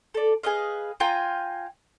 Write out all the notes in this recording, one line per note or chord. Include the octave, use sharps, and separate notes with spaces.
A4 D5
G#4 B4 D#5 F5
F4 G5 G#5 A#5